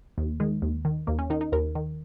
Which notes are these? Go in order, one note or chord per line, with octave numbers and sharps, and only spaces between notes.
D#2
D#3 G#3
D#2
D#3
D#2 A#3
C#4
D#3 D#4
D#4
D#2 A#4
D#3